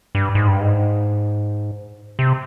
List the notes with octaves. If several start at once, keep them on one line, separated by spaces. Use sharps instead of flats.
G2
G#2
G2
G#2
C3